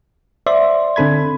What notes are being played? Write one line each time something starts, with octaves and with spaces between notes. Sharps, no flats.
C5 D5 E5 C6
D3 C4 A4 B5 G#6